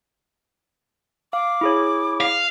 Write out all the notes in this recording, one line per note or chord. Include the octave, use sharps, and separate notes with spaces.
F5 D6
E4 G#4 C#5
F5